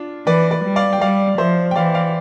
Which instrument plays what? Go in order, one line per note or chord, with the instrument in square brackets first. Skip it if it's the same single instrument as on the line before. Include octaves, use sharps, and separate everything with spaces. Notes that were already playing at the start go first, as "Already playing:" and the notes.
Already playing: [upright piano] D4 F4
[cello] E3 [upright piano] B4 D5
[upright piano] B4 D5
[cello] G3
[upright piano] D5 F5
G5
[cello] G3 [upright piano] D5 F5
[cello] F3 [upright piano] C5 E5
[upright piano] G5
[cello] E3 [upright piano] D5 F5
[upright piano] D5 F5